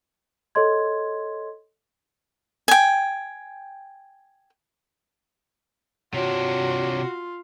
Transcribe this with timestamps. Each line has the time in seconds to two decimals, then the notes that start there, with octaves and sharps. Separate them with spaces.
0.55 A4 C#5 D#5 C6 G#6
2.68 G5 G#5
6.14 C3 D4 F4 F#4 C#5